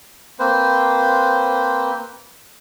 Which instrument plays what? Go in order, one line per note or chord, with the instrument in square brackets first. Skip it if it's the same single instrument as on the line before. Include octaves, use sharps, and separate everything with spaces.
[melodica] A#3 C4 B4 C5